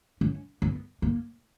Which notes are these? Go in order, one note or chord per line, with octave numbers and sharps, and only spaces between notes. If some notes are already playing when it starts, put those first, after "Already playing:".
C#4
B3
A#3